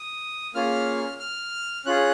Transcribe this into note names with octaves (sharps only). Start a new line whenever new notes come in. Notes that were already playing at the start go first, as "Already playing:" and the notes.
Already playing: D#6
A#3 C#4 F4 G#4 F6
F6
C#4 F4 G#4 F#6